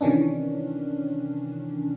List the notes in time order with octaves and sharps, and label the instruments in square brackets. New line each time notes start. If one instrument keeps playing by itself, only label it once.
[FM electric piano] C3 D#3 E3 C#4 D4